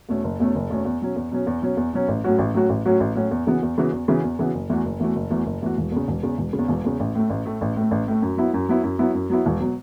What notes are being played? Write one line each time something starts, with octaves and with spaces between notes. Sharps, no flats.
E2 B2 A3 C#4
F#1
E2 B2 A3 C#4
F#1
E2 B2 A3 C#4
E2
B2 F#3 C#4
E2
B2 F#3 C#4
E2
B2 F#3 C#4
E2
B2 F#3 C#4
A1
A2 F#3 C#4 F#4
A1
A2 F#3 C#4 F#4
A1
A2 F#3 C#4 F#4
A1
A2 F#3 C#4 F#4
E2
C#3 E3 B3 F#4
E2
C#3 E3 B3 F#4
E2
C#3 E3 B3 F#4
E2
C#3 E3 B3 F#4
F#1
E2 E3 A3 F#4
F#1
E2 E3 A3 F#4
F#1
E2 E3 A3 F#4
F#1
E2 E3 A3 F#4
E1
E2 C#3
E1
E2 C#3
E1
C#3
E2
E1
E2 C#3
A1
A2 A3
A1
A2 A3
A1
A2 A3
A1
A2 A3
F#2
F#3 B3 E4
F#2
F#3 B3 E4
F#2
F#3 B3 E4
F#2
F#3 B3 E4
E1
B2 F#3